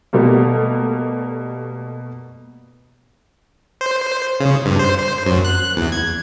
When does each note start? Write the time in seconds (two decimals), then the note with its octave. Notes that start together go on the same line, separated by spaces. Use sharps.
0.13 B2 G3 A3 A#3
3.81 C5
4.40 C#3
4.66 G2
4.79 C5
4.98 C5
5.26 F#2
5.45 F#6
5.77 E2
5.92 G#6